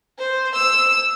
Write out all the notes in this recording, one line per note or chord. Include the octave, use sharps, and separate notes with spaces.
C5
E6